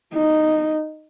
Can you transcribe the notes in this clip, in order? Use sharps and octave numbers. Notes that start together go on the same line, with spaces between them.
D#4